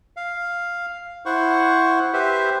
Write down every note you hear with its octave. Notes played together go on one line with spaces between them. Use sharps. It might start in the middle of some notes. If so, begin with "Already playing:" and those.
F5
E4 C5 F#5 C#6
G4 B4 C5 E5